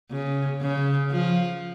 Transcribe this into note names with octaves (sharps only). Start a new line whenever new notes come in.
C#3
C#3
F3